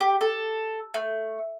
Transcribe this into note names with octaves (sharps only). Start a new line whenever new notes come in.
G4
A4
A3